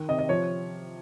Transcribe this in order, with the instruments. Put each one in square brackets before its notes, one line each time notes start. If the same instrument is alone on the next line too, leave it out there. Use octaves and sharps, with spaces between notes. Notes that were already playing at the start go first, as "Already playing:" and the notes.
Already playing: [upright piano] D#3
C3 D#5
D#5
F3 C#5